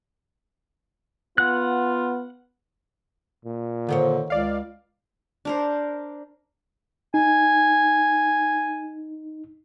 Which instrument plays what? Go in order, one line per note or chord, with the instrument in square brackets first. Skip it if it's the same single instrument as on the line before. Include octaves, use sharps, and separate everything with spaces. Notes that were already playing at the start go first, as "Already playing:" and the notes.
[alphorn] B3 [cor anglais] F4 [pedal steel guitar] F#5 F#6
[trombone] A#2
[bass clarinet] D3 [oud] D#3 C5 C#5
[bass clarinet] C#2 [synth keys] D5 F5
[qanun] D4 A#4 C5
[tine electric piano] D#4 [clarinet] G#5